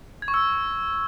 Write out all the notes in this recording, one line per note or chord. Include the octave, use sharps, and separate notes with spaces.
G#6
C#6
E6